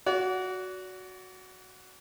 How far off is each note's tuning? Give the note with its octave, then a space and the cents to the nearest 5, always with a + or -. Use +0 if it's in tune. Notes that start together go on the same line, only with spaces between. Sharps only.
F#4 +0 D5 -40